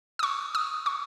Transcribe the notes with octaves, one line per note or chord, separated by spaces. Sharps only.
D#6
C#6
D#6
C#6